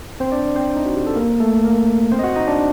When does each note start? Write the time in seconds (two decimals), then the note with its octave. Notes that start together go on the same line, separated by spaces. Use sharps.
0.20 C4 C5
0.32 D4 D5
0.56 C4 C5
0.76 D#4
0.86 F#4
0.96 G4
1.06 A4
1.16 A#3 A#4
1.40 A3 A4
1.64 A#3 A#4
2.12 C4 C5
2.19 D#5
2.24 F#4 F#5
2.36 D#4 D#5
2.48 D4 D5